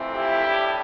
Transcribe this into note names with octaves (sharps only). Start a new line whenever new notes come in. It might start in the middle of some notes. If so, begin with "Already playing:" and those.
Already playing: F2 E3 A3 C4
E4 G4
A2 G3 D4